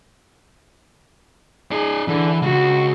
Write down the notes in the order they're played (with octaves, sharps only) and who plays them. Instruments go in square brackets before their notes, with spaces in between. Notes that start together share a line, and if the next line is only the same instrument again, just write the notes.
[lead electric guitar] D#4 D5 [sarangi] G#4
[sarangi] D3 [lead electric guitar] E3
[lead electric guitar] C#2 [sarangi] F#4